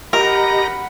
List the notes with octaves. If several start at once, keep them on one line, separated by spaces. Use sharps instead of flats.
G4 A#4 D#5 F#5 A#5 B5